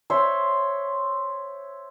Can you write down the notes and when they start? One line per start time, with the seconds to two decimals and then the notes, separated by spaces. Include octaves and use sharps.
0.10 C5 C#5 E5 C6